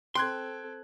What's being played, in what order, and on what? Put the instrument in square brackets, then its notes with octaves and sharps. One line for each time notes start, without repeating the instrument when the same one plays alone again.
[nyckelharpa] C4 A4 [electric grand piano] G5 F#6 G#6 [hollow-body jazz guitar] C6